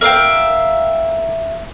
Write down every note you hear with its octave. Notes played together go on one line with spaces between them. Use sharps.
A#4 E5 F5 G5